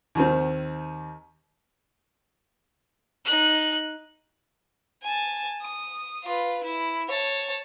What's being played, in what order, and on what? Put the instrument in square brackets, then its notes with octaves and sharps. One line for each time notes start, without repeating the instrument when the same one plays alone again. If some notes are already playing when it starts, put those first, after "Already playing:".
[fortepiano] D#2 D#3 C4
[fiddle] D#4 F#6
G#5 A5
D#6
F4 B4
E4
C#5 A5